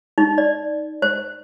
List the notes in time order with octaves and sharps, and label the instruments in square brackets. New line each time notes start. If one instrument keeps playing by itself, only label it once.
[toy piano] D#4
D5
C5